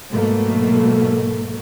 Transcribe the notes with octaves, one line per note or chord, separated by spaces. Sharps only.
G#2 B2 F#3 A3 A#3